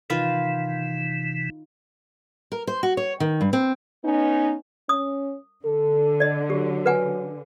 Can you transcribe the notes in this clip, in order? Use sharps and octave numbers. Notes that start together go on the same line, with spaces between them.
C3 D#3 E3 F4 B4
A#4
C5
F#4
C#5
D#3
G2
C4
B3 C#4 D#4
C#4 D#6
D3 A4
D5 D#5
F#3 G4
B4 F#5 G#5